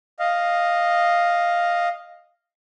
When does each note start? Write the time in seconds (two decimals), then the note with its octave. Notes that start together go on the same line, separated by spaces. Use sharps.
0.19 D#5 F5